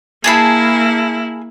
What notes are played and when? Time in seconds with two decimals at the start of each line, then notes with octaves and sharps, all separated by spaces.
0.24 A#3 E4 G#4 A5 B5